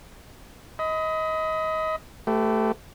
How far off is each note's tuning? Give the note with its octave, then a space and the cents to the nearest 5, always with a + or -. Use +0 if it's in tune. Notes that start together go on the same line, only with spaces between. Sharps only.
D#5 +25 B5 +30
A3 +0 G4 -15 B4 +40